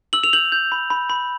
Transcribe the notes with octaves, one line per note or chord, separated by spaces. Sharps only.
E6 F#7
F7
G6 F#7
G6
B5
B5
B5